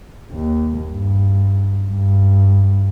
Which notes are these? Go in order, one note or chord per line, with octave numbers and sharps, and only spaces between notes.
D#2
G2
G2